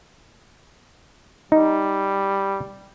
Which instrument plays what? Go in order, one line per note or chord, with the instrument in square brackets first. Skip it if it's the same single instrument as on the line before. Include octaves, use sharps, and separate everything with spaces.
[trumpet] G3 [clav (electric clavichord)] D#4